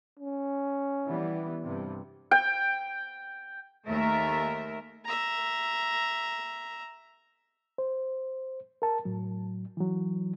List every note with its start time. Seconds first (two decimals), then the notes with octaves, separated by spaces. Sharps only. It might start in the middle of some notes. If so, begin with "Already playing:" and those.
0.19 C#4
1.07 E3 G3 B3
1.62 G2 C3 G3
2.31 G5
3.88 D#2 A3 A#4 E5
5.05 E5 A#5
7.78 C5
8.82 A#4 A5
9.05 A2 F#3
9.77 E3 F#3